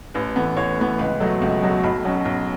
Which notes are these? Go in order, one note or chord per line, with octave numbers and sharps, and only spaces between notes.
A1 B4
A2 E3 B3
A1 C#5
A2 E3 B3
C#2 B4
B2 F#3 A3
C#2
B2 F#3 A3
B1 B5
B2 F#3 C#4
B1